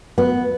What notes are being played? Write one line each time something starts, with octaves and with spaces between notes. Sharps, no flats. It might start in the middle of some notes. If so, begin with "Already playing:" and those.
B3